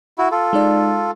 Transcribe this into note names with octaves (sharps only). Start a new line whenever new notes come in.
E4 F#4
F4 A4
G#3 D#4 D5